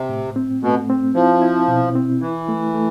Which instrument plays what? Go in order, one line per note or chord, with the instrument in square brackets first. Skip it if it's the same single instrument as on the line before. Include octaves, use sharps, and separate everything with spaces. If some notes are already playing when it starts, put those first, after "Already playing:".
Already playing: [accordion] C3
[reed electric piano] A2
C4
[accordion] B2 [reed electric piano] A3
[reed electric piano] C4
[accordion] F3 [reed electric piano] E4
[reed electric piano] E4
B2
C4
[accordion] E3 [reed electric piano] E4
[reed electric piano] A3
A3